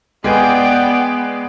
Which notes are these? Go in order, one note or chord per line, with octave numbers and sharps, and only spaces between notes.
G#3 B3 G#4 B4 D5 G5